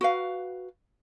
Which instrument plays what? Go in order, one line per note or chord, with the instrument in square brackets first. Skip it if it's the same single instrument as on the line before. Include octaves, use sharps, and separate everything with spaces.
[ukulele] F#4 B4 F5